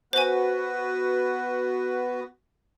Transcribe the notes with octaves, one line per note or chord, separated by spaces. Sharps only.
B3 F#4 B4 C5 G#5